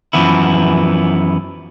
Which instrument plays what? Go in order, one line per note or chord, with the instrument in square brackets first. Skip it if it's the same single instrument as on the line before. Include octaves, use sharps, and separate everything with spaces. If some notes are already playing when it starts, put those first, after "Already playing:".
[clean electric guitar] F#2 A2 E3 F3 B3 E4